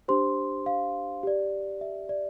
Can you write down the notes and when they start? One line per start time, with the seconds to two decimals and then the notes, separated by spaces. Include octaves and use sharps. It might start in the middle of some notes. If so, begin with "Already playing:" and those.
0.08 D4 G4 C5 C6
0.66 F5
1.23 G4 D5
1.81 E5
2.09 D5